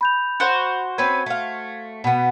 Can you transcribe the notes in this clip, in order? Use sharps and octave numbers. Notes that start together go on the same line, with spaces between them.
B5 G6 F7
F#4 C5
C4 C#4 B4 G#6
A3 F5
B2 B3